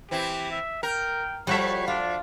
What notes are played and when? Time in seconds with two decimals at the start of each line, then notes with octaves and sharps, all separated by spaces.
0.11 E3 C4 E4 G4
0.51 E5
0.83 A#4 G5
1.47 F3 G3 F#4 A4 C#5 E5
1.88 D4 F4